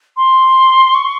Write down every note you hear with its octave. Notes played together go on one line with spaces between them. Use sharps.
C6
C#6